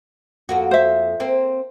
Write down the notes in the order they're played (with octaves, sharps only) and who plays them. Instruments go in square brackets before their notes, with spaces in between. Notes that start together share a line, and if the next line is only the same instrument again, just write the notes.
[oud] F2 A#3 F#4
[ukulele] C5 E5
[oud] A#3 C4